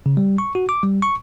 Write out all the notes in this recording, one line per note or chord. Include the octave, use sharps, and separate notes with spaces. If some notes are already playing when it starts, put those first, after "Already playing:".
C#3
G3
C#6
F#4
D6
G3
C#6